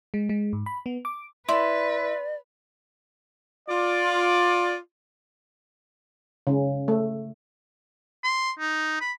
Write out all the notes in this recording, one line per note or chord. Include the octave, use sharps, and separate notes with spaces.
G#3
G#3
G#2
B5
B3
D6
E4 B4 D5 C6
F4 D5
C#3
A3
C6
D#4
B5